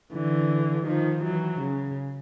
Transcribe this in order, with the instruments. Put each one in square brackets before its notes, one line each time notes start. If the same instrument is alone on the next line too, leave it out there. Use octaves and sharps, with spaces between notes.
[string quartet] D3 E3
D#3 F3
E3 F#3
C#3